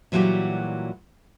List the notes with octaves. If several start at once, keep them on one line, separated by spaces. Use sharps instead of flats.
A#2 E3 F#3 G3 F#4 G4